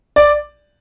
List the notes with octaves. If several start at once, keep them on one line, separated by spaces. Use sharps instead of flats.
D5